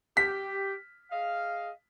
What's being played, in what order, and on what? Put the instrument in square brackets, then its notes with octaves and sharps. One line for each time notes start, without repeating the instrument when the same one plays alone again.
[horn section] G4 [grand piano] B6
[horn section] G#4 D#5 F5